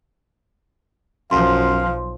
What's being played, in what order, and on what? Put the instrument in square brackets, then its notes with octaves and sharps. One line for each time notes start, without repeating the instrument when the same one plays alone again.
[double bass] B1 F3 [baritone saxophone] F#2 [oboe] F5 [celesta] C6